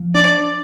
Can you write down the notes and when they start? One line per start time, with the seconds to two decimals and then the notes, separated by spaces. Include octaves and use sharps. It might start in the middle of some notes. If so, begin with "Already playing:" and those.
Already playing: F3
0.15 D4 D5